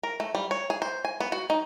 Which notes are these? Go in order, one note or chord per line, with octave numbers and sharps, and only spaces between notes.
A#4
A3
G3
C#5
G#4
C5
G#5
B3
F#4
D#4